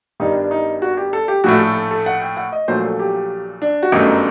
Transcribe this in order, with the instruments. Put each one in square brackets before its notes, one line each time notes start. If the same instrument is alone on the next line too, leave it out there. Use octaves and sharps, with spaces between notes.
[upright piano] G1 G2 D#3 G3 D#4
D4
D#4
F#4
G4
A4
G4
A#1 A2 A3 F#4
A4
A4
A4
F#5
G5
F#5
D#5
A#1 A#2 F#3 A3 C5
A4
G4
D4
F#4
G1 F#2 D#3 F#3 A3 D#4